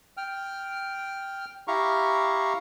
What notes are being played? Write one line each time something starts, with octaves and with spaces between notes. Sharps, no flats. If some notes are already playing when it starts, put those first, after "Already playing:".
G5 F6
E4 G4 F5 A#5 C#6